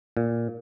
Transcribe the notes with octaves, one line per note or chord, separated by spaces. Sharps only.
A#2